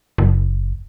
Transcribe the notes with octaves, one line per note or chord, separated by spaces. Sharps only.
F#1